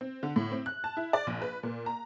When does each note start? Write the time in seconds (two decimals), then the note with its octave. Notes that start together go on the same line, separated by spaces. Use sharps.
0.01 C4
0.23 D3
0.36 A2
0.51 C4
0.66 F#6
0.84 A5
0.97 E4
1.13 D5
1.27 A#1
1.42 B4
1.63 A#2
1.86 A#5